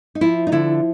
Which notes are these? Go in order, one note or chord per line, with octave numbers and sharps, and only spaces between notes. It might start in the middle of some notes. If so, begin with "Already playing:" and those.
D#4
F3 E4
D#4
D3 E4